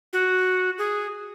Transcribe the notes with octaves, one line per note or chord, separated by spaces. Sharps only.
F#4
G#4